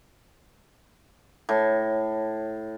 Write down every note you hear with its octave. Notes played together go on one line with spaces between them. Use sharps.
A2